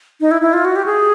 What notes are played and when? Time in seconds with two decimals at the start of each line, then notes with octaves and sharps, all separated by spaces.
0.21 D#4
0.31 E4
0.42 E4
0.53 F4
0.65 F#4
0.76 G4
0.86 G#4